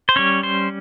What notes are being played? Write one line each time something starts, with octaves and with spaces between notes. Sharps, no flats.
C5
G3 C#4 C#5
C5